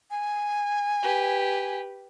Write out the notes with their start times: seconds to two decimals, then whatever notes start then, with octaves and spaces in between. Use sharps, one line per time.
0.11 G#5
1.03 G4 B4